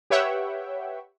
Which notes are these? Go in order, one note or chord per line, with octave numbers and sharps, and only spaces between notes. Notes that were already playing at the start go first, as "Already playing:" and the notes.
G4 B4 C#5 E5 F#5 G5